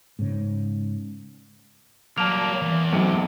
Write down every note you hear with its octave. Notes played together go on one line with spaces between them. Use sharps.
G#2 C#3
F#3 G3 A#3 A5 F7
E2
B1 G#2 C3